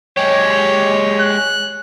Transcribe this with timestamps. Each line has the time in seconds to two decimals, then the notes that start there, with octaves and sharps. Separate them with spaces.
0.17 G#3 G4 C#5
1.20 F#6